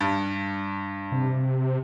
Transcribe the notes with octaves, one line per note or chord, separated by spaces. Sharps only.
G2
C3